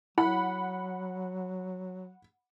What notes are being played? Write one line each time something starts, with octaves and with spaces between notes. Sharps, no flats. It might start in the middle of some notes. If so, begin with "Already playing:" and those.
F#3 E4 F#5 B5